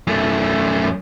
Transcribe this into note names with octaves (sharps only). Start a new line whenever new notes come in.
F#2 A3